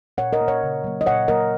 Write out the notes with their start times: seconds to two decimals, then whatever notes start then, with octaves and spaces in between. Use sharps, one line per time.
0.18 A#2 C#5 F#5
0.33 A#4 D#5
0.41 A#3
0.48 C#5 F#5
0.63 C#3
0.84 F#3 A#3
1.01 D#5
1.06 A#2 C#5 F#5
1.28 F#3 A#3 A#4 D#5